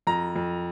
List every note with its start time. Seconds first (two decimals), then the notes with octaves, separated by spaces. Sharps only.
0.07 F2 A#5
0.36 F2